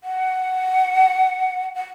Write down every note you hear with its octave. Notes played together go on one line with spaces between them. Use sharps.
F#5
F#5